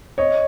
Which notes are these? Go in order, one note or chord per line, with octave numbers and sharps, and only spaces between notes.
C#5 D#5